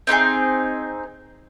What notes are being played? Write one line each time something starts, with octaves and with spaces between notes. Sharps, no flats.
C4 D#4 G4 G#4